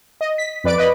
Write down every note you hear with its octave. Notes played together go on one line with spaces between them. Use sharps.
D#5
B6
F2 B4 D5 D7
B4 D#5 B5